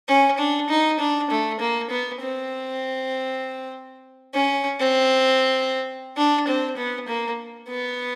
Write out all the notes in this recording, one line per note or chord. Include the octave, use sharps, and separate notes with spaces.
C#4
D4
D#4
D4
A3
A#3
B3
C4
C#4
C4
D4
C4
B3
A#3
B3